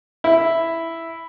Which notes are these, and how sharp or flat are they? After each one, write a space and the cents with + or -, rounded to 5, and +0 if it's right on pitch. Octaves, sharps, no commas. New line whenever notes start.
E4 +0